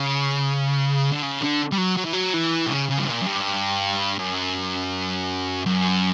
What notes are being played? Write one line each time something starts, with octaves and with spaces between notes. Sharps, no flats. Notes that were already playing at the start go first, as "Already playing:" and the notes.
Already playing: C#3
D3
C#3
D3
G3
F#3
F#3
E3
F#3
E3
B2
C#3
C#3
G2
A#2
F#2
G2
F#2
F#2